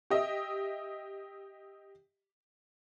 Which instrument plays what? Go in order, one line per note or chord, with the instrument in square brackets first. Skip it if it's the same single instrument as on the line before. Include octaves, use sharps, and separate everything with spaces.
[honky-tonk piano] G4 D#5 E5